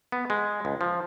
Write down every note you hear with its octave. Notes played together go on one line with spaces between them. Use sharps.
B3
G#3
C#2
F3